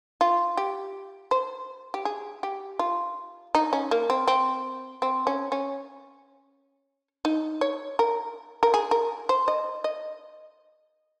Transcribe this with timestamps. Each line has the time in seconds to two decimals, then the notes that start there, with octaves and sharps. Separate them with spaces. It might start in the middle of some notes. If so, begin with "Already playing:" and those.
0.21 F4
0.57 G4
1.31 C5
1.94 G4
2.05 G#4
2.43 G4
2.79 F4
3.55 D#4
3.73 C#4
3.91 A#3
4.10 C4
4.28 C4
5.02 C4
5.27 C#4
5.52 C#4
7.25 D#4
7.61 C#5
7.99 A#4
8.63 A#4
8.74 G#4
8.91 A#4
9.29 C5
9.48 D#5
9.84 D#5